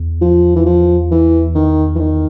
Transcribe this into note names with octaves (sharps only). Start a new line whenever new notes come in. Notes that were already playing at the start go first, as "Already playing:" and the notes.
Already playing: E2
F3
E3
F3
E3
D#3
E3
D#3